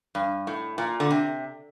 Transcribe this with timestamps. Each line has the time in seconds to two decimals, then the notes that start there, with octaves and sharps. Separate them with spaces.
0.15 G2
0.47 A2
0.78 A#2
1.00 D3
1.11 C3